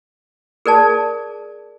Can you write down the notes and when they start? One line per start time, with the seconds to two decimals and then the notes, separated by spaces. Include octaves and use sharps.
0.66 G#4 A#4 D5 A5